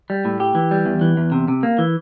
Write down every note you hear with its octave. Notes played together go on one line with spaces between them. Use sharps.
G3
A2
G4
E3
G3
E2
E3
E2
C3
C3
A#3
E3